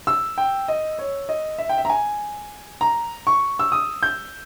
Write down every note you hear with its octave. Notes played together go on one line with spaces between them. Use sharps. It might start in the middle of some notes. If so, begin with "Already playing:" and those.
E6
G5
D#5
C#5
D#5
E5
G5
E5
A#5
G#5
A#5
C#6
E6
D#6
G6